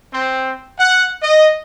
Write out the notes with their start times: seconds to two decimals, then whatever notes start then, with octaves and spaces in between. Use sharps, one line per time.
0.13 C4
0.78 F#5
1.22 D#5